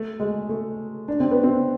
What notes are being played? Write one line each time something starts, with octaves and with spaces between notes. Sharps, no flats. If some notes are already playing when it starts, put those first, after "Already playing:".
Already playing: A3
G#3
A3
D4
C4
B3
C4